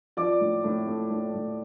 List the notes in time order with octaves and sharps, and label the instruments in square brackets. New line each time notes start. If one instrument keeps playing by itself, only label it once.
[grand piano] F3 D5 D6
A2
A2
A3
A2
A2